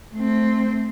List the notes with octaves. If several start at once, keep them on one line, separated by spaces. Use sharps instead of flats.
A3 C4